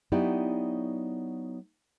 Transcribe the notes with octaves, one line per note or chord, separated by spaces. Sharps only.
F#3 B3 D#4 E4 G4 D5